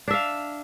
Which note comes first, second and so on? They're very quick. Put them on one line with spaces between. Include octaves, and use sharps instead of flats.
D4 E5 F5